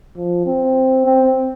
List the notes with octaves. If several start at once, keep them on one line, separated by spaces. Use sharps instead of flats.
F3
C4
C4